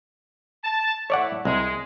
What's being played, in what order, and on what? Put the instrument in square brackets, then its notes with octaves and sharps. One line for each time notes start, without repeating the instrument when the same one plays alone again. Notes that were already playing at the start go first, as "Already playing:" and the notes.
[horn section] A5
[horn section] A3 E4 [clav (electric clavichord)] C#5 D5 F#5
[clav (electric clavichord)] C2 [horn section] G#3